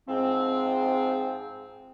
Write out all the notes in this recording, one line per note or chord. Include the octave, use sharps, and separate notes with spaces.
G#2 F3 C4